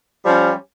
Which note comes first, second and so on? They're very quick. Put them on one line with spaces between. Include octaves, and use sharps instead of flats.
G3 F3 C#4